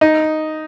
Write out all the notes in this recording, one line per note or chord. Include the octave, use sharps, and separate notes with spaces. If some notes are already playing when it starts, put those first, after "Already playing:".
D#4